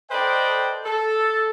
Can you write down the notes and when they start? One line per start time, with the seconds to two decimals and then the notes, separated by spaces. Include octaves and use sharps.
0.11 A4 B4 C5 D5 D#5 G5
0.85 A4